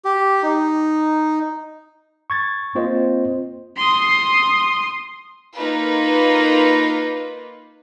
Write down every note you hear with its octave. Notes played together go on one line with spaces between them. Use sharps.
G4
D#4
C#6 G#6 A6
A#3 C4 F4 C5 D#5
C6 D#6
A#3 D#4 F4 B4